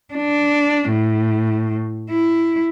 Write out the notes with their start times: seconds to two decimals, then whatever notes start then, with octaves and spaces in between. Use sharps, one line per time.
0.14 D4
0.90 A2
2.11 E4